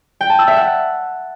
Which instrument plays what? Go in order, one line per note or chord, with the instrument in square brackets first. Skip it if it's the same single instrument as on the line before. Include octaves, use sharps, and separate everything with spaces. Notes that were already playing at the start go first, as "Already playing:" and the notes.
[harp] G5
A5
E6
E5
F#5